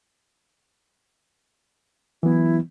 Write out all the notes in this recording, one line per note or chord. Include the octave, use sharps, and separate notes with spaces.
E3 F#3 B3 E4